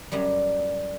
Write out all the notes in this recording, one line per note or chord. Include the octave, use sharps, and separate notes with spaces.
F#2 F#3 G3